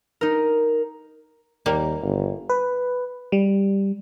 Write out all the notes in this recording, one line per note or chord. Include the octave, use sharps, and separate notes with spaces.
D#4 A#4
D#2 G3 A#3
G1
B4
G3